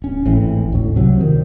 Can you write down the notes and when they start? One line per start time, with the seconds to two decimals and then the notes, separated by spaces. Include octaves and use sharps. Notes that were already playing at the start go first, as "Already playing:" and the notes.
0.02 D1 C#4
0.25 G#1 A2 E3 C4
0.72 D2 A2
0.96 C2 C3 F#3
1.21 D#3